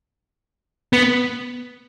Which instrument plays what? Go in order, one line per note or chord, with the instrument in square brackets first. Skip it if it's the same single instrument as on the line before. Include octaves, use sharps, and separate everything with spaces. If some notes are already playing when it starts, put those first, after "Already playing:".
[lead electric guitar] B3